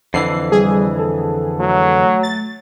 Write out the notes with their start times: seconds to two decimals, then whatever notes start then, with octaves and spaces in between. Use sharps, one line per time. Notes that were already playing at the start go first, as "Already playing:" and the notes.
0.14 F2 D3 E3 C7
0.52 G3 G#4
0.99 A4
1.60 F#3 A3
2.23 A6